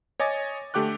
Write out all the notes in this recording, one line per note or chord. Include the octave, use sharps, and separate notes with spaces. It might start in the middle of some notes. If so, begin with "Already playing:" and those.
C#5 D#5 G#5 D6 A6
D3 A3 G4 G5 D6 F#6